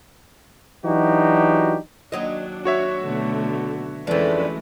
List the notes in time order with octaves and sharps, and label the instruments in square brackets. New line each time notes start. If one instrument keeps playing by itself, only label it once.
[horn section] E3 F#3 D4 D#4 F#4 G4
[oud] D#2 F#3 D#5 [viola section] D4
[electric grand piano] F#4 C#5 E5
[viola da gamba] B2 D3 [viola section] A3
[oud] F2 D4 [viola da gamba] E3 C#4 B4 [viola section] G#3 A3